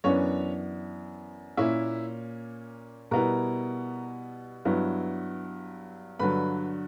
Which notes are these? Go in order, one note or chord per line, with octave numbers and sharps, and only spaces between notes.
F#2 E3 B3 C#4 D4 C#5
A#2 A#3 C#4 E4 E5
B2 G3 B3 E4 A#4 A#5
G2 F#3 B3 E4
G2 D3 F#3 B4 B5